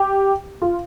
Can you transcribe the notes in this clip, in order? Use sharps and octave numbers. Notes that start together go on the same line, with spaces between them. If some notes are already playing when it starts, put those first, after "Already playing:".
Already playing: G4
F4